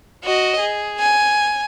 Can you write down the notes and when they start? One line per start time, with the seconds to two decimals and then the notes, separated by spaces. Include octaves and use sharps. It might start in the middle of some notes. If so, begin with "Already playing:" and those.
0.24 F#4 D#5
0.60 G#4
0.99 G#5